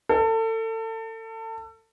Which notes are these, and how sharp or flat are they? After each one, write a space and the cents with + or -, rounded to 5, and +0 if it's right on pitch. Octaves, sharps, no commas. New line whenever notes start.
A4 +30